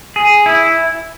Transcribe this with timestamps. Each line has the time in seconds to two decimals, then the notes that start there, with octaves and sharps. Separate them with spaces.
0.16 G#4
0.46 E4